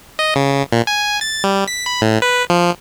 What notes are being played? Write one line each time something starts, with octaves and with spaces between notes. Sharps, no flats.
D#5
C#3
A#2
G#5
A6
G3
B6
B5
A2
B4
F3